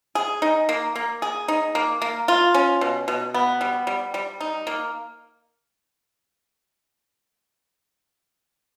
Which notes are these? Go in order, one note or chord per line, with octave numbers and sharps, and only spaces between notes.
G#4
D#4
A#3
A#3
G#4
D#4
A#3
A#3
F4
C#4
B2
B2
B3
G3
G3
G3
D#4
A#3